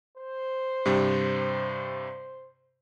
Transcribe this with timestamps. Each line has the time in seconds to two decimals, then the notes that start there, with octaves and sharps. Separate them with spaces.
0.17 C5
0.86 G2 C3 G3